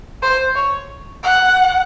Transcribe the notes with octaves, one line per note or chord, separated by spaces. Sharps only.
C5
C#5
F#5